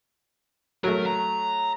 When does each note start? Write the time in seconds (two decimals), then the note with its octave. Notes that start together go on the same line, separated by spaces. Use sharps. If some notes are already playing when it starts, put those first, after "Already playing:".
0.84 F#3 A3 A#4
1.06 A#5